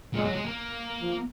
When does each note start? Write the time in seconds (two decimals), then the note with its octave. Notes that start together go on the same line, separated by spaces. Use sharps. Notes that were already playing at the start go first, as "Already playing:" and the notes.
0.14 A#2 G#3
0.24 F#3
0.35 G#3
0.46 A#3
1.00 F3